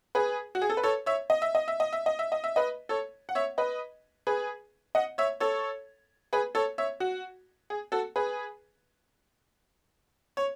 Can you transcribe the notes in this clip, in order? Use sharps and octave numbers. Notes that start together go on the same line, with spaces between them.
G#4 B4
F#4
G#4
A4
B4
A4 C#5
C#5 E5
D#5
E5
D#5
E5
D#5
E5
D#5
E5
D#5
E5
B4 D#5
A4 C#5
F#5
C#5 E5
B4 D#5
G#4 B4
D#5 F#5
C#5 E5
A4 C#5
G#4 B4
A4 C#5
C#5 E5
F#4
G#4
F#4 A4
G#4 B4
C#5